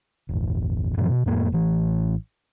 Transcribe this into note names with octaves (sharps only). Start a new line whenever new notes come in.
E1 A1
F#2 A#2 E3 F3
B2
F2 A2 A#3
A1 E3